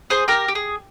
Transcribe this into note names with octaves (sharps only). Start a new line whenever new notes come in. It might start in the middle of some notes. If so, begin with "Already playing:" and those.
G#4 C5
G4 A#4
G4
G#4